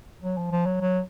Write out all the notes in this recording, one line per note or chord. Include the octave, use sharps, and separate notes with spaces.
F#3
F3
F3
F#3
F#3